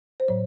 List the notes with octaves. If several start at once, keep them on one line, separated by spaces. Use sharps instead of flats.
C5
A2 F#3 C#5